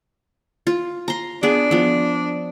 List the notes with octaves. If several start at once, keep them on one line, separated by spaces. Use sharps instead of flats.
F4
A#5 C6
B3 D4 G#4
F3 B3